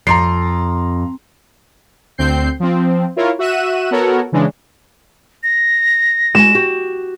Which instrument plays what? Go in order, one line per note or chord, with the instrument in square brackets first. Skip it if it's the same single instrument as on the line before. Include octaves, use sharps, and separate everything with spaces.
[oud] F2 [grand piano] A#5 C6 C7
[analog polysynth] D2 C4 G6 C7
F3 C4
E4 F4 A#4 C#5
F#4 E5 F#6 D#7 E7
B3 F#4 A4 A#4 C#5 F#5
C#3 E3 G#3 D4
[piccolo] A#6
[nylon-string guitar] G#3 F#4 G#5 [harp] E7
[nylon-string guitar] F#4 G4